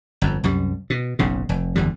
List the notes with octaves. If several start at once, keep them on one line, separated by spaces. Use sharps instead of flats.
G1 F2
C2 F#2 G3
B2
F#1 B1 C#3
F1
F#1 E2 D3 G3